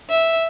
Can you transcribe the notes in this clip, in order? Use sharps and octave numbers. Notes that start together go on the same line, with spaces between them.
E5